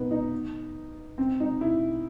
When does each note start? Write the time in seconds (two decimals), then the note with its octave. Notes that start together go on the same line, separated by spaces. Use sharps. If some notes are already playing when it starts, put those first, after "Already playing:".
Already playing: B3 D#4
0.11 D#4
1.18 C4
1.40 D#4
1.61 E4